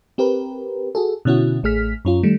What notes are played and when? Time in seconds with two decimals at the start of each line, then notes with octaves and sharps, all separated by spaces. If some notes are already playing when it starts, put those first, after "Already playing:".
0.18 C4 G4 A#4 B4
0.95 F#4 G#4 A4
1.25 B2 D3 C#4 E4 F#4
1.63 A1 A3 G#4 F6 B6
2.05 F#2 C#4 F4
2.23 D#3 G3 A3